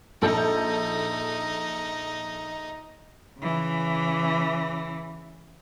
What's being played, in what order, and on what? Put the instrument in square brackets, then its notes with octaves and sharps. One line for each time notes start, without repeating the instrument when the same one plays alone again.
[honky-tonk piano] A#1 A4 G6 [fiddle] D#4
[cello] C#3 E3